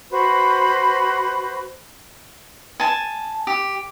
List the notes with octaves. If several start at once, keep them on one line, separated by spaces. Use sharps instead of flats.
F#4 B4 C5 B5
G#5 A5
G4